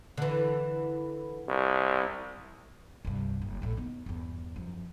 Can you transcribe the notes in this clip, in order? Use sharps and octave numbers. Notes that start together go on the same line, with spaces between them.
D3 E3
C2
C2 G2
F#1
A1 A2
B3 D#4
E2 G2
F#2 F3